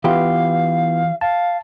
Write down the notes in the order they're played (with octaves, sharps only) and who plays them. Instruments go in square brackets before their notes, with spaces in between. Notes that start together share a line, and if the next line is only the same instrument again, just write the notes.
[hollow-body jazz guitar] E3 G4 [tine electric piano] B3 E4 F4 [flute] F5
[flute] F5 [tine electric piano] A5